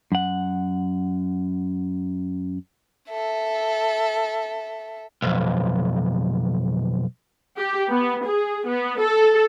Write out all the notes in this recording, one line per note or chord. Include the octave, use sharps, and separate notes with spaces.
F#2 F#5
A4 E5
B1 F2
G4
B3
G#4
B3
A4